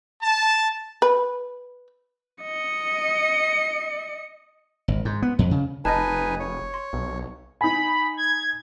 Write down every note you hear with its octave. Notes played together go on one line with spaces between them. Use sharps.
A5
B4
D#5 C#7
G#1
G#2
B3
F2
C#3
F1 D#4 B4 D#5 G#5 A5
C#5
C6
B1
D#4 G#5 B5
G#6